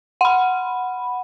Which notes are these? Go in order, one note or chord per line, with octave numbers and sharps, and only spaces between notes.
F#5 B5